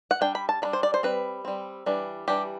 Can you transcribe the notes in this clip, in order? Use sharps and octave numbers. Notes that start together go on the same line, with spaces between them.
F#5
G3 D4 G5
B5
A5
G3 D4 B5
C5
D5
C5
G3 C4 B4
G3 C4
E3 G3 D4
E3 G3 D4 G4